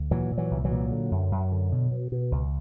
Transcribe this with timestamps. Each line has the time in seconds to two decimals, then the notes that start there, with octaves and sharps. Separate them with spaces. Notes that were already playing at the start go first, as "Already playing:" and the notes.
Already playing: D2
0.11 A#2 E3 F#3
0.31 A#2
0.38 E3 F#3
0.51 C2
0.65 E3 F#3
0.71 A#2
0.91 D3
1.11 F#2
1.31 F#2
1.52 D3
1.72 B2
1.91 B2
2.12 B2
2.32 C#2